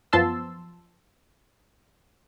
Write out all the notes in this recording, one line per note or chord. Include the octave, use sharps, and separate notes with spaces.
F#2 F3 B3 A5 C6 E6